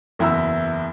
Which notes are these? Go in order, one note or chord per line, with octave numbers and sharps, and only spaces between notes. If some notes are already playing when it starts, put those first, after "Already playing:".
F#1 E2 E4 E5 A#5 E6